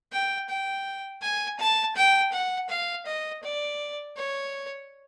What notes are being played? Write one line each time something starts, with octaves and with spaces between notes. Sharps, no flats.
G5
G5
G#5
A5
G5
F#5
F5
D#5
D5
C#5